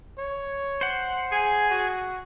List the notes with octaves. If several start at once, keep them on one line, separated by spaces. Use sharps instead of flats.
C#5
C5 F#5
G#4 G#5
F#4